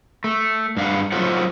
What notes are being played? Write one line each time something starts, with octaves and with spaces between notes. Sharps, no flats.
A3
G2 F5 F#5
F#3 A3 F4 A4 C5 F#5